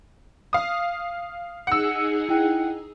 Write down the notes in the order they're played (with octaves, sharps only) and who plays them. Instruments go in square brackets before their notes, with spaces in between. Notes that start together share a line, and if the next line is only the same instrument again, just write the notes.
[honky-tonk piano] F5 D#6
[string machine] D#4 G#4 [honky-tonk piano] F#5 E6
[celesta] E4 G5 F#6